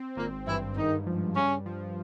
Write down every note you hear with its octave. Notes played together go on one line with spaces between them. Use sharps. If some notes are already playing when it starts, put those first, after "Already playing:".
Already playing: C4
G#1 A#2 A#3
G2 E3 E4
G#2 D#3 D#4
F3
G2 C#3 C#4
F3